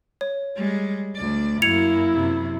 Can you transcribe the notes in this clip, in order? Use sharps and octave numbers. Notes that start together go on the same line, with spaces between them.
C#5
G3 G#3
D2 D5
F#2 A#3 E4 G#6 C#7 F7
F#2 C3